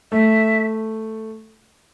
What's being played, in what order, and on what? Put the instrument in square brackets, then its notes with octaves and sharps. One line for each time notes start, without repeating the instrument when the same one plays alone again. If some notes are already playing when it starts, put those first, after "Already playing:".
[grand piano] A3 [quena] E5